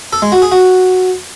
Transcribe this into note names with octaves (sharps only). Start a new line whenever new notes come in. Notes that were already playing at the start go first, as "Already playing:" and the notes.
A4
G#3
F#4
G#4
F#4